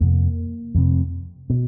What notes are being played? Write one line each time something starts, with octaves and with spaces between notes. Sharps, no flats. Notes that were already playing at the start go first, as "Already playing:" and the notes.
F2 C3 A#3
F2 C3
B2